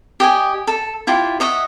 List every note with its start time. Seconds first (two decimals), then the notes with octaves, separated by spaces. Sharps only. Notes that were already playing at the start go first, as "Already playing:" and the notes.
0.20 G4 D#5 G#5
0.67 A4
1.07 E4 F4 G4
1.40 C#5 D#5 E5 F#5